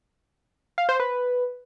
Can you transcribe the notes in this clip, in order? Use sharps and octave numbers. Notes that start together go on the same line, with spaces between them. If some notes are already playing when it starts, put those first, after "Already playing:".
F5
C5
B4